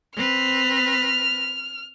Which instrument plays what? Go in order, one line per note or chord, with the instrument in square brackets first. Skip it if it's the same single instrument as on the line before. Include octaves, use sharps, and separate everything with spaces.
[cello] C4 B4 [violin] F6